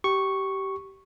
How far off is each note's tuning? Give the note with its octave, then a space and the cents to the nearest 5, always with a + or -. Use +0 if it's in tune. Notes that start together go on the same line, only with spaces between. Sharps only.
G4 -20 C#6 -5